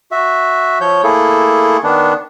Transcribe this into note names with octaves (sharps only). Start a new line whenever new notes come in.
F#4 E5
F3 C#5 G6
A3 A#3 E4 G#4 A4
D#3 B3 D4